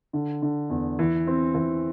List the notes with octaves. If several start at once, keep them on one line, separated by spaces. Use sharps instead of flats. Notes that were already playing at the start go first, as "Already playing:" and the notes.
D3
D3
E2
E3
C4
E3